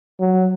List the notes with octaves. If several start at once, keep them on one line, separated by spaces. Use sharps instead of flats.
F#3